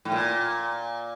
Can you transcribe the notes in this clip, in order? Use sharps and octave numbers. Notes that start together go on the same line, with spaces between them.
A2
A#2